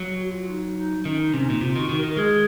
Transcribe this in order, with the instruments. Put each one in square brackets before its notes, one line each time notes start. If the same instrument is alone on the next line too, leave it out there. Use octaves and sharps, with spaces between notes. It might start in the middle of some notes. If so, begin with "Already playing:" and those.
Already playing: [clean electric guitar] F#3
[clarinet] F#4
F#4
F4
D#4
D#4
[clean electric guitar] D#3 [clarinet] C#4
[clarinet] D#4
[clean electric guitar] C3 [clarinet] C#4
[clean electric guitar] A#2 [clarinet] D#4
[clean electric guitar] C3 [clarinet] F4
[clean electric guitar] D#3 [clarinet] F#4
[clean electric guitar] D#3
[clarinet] A#4
[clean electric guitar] D#3
[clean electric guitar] G#3 [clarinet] G#4